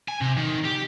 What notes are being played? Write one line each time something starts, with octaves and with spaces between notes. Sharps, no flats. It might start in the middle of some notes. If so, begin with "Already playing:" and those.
G#5
C3
D#3
G4